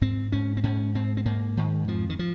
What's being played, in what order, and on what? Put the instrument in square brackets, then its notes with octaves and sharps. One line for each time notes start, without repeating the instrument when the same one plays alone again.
[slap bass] G#2 C4
G#2 C#4
C4
G#2 C#4
G#2 C4
C4
G#2 A#3
G#2 D#3
F2 F3
D#3
F3